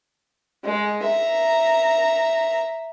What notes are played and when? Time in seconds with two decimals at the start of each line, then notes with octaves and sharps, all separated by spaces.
0.65 G#3
1.04 E5 A#5